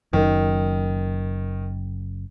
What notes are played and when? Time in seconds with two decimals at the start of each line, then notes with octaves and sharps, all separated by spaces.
0.13 F#1 F#2 D#3